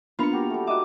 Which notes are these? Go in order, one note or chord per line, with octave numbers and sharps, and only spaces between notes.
A#3 B3 D4 F4 B5 C#7 F7
F#4 G4 A#4
G3 A3
G3 D#4 F#4 D#5 E5 D6